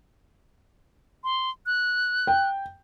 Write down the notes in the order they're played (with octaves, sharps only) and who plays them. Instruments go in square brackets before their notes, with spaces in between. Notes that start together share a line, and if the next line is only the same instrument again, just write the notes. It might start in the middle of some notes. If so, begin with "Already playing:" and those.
[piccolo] C6
F#6
[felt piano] G5